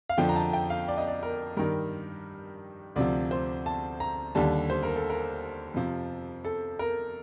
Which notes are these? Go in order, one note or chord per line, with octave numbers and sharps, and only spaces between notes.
F5
F2 D3 F3 G5
A#5
A5
G5
F5
D5
D#5
D5
A#4
G2 D#3 G3 A#4
D2 C3 F3 D5
C5
A5
A#5
D#2 D3 G3 A5
C5
A#4
A4
A#4
F2 C3 F3
A4
A#4